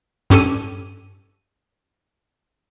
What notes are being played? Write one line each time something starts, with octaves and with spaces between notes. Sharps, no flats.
G2 C#4 G4 A4 D#7